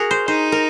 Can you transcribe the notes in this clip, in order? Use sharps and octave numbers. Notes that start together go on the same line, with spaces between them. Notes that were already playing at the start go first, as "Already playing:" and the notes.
Already playing: F#4 G#4 A#4
C5
D#4 C5
A#4